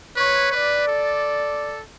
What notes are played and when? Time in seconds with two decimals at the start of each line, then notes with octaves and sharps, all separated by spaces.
0.16 B4 C#5
0.51 B4 D5
0.88 A4